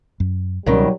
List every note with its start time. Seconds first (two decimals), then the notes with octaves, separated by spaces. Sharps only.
0.20 F#2
0.66 C#2 B2 D#3 F#3 G3 C#4